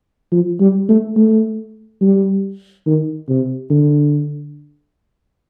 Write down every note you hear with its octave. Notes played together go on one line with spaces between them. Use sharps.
F3
G3
A3
A3
G3
D#3
C3
D3